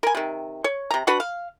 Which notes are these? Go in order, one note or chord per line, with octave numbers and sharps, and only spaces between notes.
A#4 G#5
C3 D#3
C#5
C3 A#5
D4 F#4 B4 F#5
F5